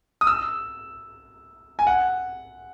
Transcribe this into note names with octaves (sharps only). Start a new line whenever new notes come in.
D#6
E6
G#5
F#5